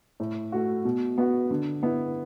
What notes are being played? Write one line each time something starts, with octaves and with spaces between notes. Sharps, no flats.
A2
A3 F#4
B2
B3 F#4
D3
B3 E4